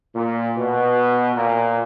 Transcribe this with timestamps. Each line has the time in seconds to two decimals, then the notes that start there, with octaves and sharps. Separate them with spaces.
0.15 A#2
0.57 B2
1.36 A#2